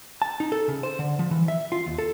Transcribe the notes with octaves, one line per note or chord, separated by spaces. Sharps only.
A5
D#4
A4
C#3
C5
D3
F3
E3
E5
F4
D#2
A4